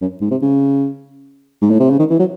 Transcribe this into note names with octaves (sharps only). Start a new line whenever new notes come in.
F#2
G#2
C3
C#3
G#2
A2
C3
C#3
D#3
E3
F#3